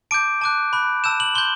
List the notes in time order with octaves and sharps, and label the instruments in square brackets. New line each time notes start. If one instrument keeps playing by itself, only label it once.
[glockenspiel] A5 D6 G6 D7
A5 D6 F#6
B5 F#6
A5 E6 G6 E7
F#7
C6 G6 G7